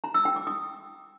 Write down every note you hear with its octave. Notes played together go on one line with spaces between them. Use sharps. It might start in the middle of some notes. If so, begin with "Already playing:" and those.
A#5
E6
G5
D6
D#6